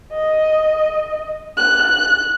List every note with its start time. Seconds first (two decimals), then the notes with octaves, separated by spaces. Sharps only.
0.12 D#5
1.57 F#6